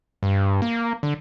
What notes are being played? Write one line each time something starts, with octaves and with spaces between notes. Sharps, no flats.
G2
A#3
D3